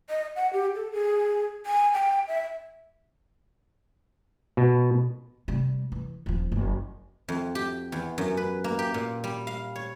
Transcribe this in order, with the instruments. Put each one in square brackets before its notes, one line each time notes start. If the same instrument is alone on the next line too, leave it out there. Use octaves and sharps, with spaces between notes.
[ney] D#5
F#5
G4
A4
G#4
G#5
G5
E5
[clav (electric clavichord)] B2
[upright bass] C3 G3
E3
D#1 F3
F#1
[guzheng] F2
G4
E2
F#2
B4
A#3
G4
A#2
G3
F5
C#5